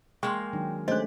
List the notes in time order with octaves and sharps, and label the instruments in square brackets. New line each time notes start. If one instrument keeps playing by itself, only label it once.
[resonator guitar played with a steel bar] G#3 A#3 [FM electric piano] G5 [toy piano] C6 C#6
[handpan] D#3 F#3 D4
[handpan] G#3 A3 C#4 [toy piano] D4 D#5 [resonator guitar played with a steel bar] G4 [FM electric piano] C5 F#6